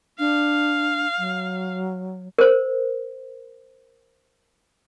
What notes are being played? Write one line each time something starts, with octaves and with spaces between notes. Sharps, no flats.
D4 F5
F#3
A#4 C5